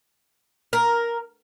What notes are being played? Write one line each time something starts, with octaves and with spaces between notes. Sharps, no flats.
A#4